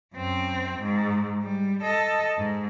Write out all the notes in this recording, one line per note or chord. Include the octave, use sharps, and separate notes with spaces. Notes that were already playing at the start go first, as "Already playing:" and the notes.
F#2 C4
G#2
G3
A4 D#5
G#2